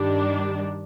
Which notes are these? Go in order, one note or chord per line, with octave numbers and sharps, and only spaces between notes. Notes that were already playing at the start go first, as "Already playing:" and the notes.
Already playing: G2 D#3 G3 D4